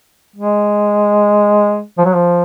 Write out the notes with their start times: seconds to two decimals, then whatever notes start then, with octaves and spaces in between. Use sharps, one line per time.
0.36 G#3
1.98 F3
2.05 F#3
2.14 F3